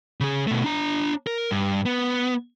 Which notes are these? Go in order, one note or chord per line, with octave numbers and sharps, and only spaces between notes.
C#3 G#4
B2 A3
D4 A#5
A#4
G2
B3